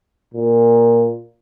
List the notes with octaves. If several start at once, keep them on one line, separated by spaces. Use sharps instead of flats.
A#2